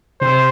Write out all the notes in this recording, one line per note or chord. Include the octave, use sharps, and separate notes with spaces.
C3 C5